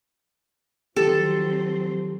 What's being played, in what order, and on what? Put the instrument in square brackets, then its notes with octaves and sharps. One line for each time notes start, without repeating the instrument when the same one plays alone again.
[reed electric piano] D#3 G4 [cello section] F3 F#3 C4 [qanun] A4